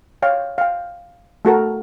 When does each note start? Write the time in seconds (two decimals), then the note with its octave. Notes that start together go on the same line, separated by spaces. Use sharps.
0.22 C#5 F5 G5
0.58 F5 G5
1.45 A3 F#4 A4 A#4